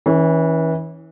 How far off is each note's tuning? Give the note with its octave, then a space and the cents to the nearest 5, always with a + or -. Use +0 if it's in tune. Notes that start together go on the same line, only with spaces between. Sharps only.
E3 -30 C#4 +0